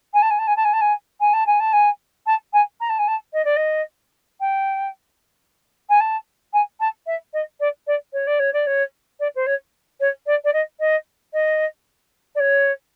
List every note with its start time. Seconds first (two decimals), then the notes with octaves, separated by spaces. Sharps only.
0.13 G#5
0.22 A5
0.30 G#5
0.38 A5
0.47 G#5
0.56 A5
0.64 G#5
0.73 A5
0.81 G#5
1.20 G#5
1.33 A5
1.46 G#5
1.60 A5
1.72 G#5
2.26 A5
2.53 G#5
2.80 A#5
2.89 A5
2.98 G#5
3.07 A5
3.33 D#5
3.44 D5
3.56 D#5
4.40 G5
5.89 G#5
6.00 A5
6.53 G#5
6.80 A5
7.06 E5
7.33 D#5
7.60 D5
7.87 D5
8.13 C#5
8.26 D5
8.39 C#5
8.53 D5
8.66 C#5
9.19 D5
9.35 C5
9.46 C#5
10.00 C#5
10.26 D5
10.44 D5
10.53 D#5
10.79 D#5
11.33 D#5
12.35 D5
12.39 C#5